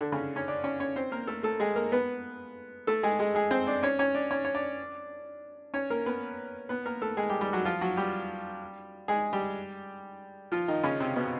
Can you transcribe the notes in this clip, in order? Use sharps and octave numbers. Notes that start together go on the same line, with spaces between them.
D3 D4
C#3 C#4
C#4 C#5
D4 D5
C#4 C#5
C#4 C#5
C4 C5
A#3 A#4
A3 A4
A3 A4
G#3 G#4
A#3 A#4
B3 B4
A3 A4
G#3 G#4
G#3 G#4
G#3 G#4
C4 C5
D4 D5
C#4 C#5
C#4 C#5
D4 D5
C#4 C#5
C#5
D4 D5
C#4 C#5
A#3 A#4
B3 B4
B3 B4
A#3 A#4
A3 A4
G#3 G#4
G3 G4
G3 G4
F#3 F#4
F3 F4
F#3 F#4
G3 G4
G#3 G#4
G3 G4
F3 F4
D#3 D#4
C#3 C#4
C3 C4
B2 B3